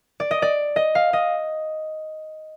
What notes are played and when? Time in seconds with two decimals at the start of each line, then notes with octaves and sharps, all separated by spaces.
0.20 D5
0.31 D#5
0.42 D5
0.76 D#5
0.95 F5
1.13 D#5